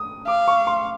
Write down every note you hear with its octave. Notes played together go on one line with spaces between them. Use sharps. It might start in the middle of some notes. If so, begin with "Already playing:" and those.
Already playing: D#6
F5 D6
C#6
C6